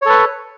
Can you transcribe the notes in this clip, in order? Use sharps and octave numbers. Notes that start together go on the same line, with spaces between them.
A4 B4 C#5